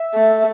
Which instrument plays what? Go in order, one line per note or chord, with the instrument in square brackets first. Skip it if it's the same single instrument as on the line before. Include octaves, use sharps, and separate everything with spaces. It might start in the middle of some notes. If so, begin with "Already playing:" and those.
Already playing: [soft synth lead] E5
[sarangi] A3